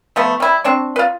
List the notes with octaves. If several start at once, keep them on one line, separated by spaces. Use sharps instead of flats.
F3 A3 B3
G3 E4
C4 D4 C#6
F4 B4